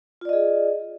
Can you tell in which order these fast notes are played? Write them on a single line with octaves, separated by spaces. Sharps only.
F4 D5 D#5 G#4